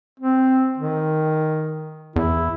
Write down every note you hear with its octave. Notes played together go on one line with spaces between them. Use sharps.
C4
D#3
E2 E4